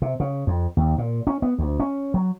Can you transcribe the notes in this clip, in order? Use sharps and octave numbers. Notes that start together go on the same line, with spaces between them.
C3
C#3
F2
D#2
A#2
C#4
B3
D2
C#4
F#3